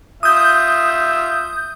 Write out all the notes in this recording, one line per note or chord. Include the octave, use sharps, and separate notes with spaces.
F4 E5 D#6 G6